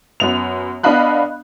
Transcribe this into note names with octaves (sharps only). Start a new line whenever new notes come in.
F#2 B3 F7
B3 D4 D#5 F5 B5 F#6